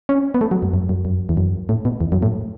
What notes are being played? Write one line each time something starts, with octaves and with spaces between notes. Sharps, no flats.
C#4
B3
A3
F#3
F#2
F#2
F#2
F#2
E2
F#2
A2
B2
E2
F#2
A2